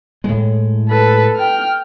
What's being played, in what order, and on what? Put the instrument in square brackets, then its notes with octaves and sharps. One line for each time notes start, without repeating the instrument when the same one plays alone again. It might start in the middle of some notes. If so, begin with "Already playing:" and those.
[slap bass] A2 G#3
[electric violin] A4 B4
G5 F6